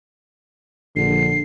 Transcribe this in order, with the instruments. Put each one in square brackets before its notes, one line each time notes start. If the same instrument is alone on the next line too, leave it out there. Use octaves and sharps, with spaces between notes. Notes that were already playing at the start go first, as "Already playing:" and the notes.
[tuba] A#1 [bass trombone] D3 [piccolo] C7